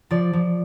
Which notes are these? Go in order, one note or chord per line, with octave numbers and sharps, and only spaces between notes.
F3 D5
F3